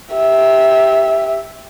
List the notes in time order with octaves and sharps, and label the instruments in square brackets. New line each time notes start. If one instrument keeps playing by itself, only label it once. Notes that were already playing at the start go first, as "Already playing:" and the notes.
[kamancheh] G4 E5